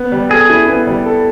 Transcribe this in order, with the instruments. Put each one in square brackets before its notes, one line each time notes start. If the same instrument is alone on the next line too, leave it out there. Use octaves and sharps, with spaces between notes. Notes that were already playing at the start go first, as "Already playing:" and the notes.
Already playing: [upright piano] B3
G3
[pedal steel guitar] G#4 [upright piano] A4
[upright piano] E4
B3
G3
A4